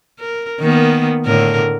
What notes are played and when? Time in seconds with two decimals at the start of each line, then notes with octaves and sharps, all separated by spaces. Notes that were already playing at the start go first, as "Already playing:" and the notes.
0.19 A#4
0.60 D#3 A#3 B3
1.26 A2 D3 A#4